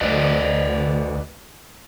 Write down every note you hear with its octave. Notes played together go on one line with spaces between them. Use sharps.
D2 B4 D5 D#5